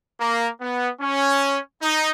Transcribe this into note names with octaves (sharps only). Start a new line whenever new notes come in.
A#3
B3
C#4
D#4